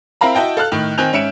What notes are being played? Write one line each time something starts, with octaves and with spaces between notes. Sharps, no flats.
C4 E4 A#4 F5 A#5 B5
E4 F#4 D#5 G5 A5
A4 F5 A5 F6 F#6
A2 D#3
D#3 C4 G#5 F#6 G6 F7
G#2 C#4 E5 C#7 D7 E7